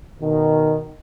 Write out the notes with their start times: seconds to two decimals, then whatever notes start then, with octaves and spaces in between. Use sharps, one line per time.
0.20 B2 D#3